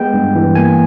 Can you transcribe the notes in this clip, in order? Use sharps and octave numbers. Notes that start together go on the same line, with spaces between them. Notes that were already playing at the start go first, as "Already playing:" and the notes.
Already playing: G#3 B3 G5
G2
E3
A#3 G#5